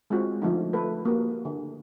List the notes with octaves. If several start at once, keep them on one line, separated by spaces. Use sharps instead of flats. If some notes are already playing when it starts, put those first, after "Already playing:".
G#3 C4 F4 F#4
D3 F3 A3 D#4
A3 A4 B4
A#3 F#4 G4
D3